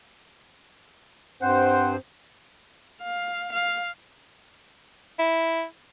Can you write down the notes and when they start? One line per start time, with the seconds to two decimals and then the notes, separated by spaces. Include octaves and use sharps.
1.42 G2 C4 C5 F#5
3.02 F5
3.53 F5
5.19 E4